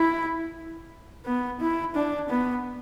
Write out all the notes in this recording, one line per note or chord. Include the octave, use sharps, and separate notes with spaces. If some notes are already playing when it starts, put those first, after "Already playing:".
Already playing: E4
B3
E4
D4
B3